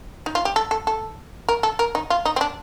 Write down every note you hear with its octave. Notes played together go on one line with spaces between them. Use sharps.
D#4
F4
G4
A4
A4
A4
A#4
A4
A#4
D#4
F4
D#4
C4
D4